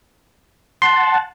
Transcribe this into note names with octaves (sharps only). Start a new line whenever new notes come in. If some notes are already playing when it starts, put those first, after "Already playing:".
F#5 A5 C6